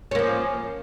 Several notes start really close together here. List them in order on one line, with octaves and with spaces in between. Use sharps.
C#4 A#3 F3